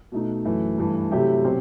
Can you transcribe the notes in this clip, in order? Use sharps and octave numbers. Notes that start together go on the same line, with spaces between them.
B2 A3 D#4
F#2 E3 A3
G2 E3 A3
C3 F#3 A3 E4 G4
B2 F#3 C4 G4